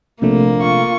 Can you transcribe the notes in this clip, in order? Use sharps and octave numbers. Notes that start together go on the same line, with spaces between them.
A#1 C3 A3 A#3
F4 C#6